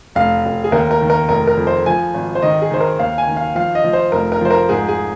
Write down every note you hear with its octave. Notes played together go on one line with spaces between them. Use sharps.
F1 F5
F1
G#4
D#2 A#4
A#4
D#3
A#4
F1 A#4
A#4
F2
C5
F3 G#5
G#1
C5
D#3 D#5
G#4
D#3 C5
A#4
D#2 F5
G#5
D#3
F5
F3 F5
D#5
F3
C5
F1 A#4
A#4
F3 C5
A#4
G#2 G#4
G#4